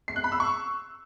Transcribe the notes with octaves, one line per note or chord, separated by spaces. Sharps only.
C7
F#6
B5
E6
C#6